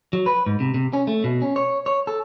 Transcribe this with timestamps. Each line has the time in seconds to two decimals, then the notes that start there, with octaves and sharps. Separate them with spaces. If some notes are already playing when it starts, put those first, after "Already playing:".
0.13 F#3
0.26 B4
0.46 G#2
0.60 C3
0.74 C3
0.93 C#4
1.07 A3
1.24 B2
1.42 C#4
1.56 C#5
1.86 C#5
2.07 A4